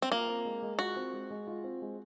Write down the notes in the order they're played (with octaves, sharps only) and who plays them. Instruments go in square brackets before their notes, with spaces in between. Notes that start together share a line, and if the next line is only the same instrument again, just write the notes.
[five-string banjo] C4
[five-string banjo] A#3 [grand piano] F4
[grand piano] C4
G#3
G#3
[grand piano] F4 [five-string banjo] F#4
[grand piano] C4
G#3
G#3
F4
C4
G#3